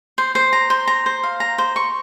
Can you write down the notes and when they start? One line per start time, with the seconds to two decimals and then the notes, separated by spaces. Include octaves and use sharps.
0.18 C5
0.35 C5
0.53 A#5
0.70 C5
0.87 A#5
1.06 C5
1.23 F5
1.40 A#5
1.58 C5
1.76 C#6